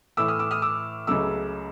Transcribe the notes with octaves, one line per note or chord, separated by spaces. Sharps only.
A2 E3 A3 D6 E6
D#6 F6
D6 E6
D#6 F6
D6 E6
C#2 C#3 F#3 A3 D6 E6